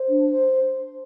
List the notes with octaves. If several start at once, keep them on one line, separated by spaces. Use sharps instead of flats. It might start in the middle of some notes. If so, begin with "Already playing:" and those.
Already playing: C5
D4
C5